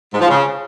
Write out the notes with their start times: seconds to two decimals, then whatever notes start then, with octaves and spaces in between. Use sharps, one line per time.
0.13 G#2
0.21 F3
0.29 C#3